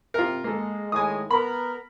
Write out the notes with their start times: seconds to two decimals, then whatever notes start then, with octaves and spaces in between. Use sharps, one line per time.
0.14 C3 F4 A#4
0.44 G#3 A#3 A4
0.92 A2 D#3 G#3 G#5 D#6
1.31 B3 A#4 B5